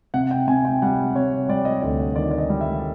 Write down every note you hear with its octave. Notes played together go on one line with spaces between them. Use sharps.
C3 F#5
G5
C3 G#5
G5
G3 F#5
C3 C#5
G3 D5
D#5
D2 D#5
D#5
D#3 D5
D5
D#5
G3
E5